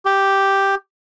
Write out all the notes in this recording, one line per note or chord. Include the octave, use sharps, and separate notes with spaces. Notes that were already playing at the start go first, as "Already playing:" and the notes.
G4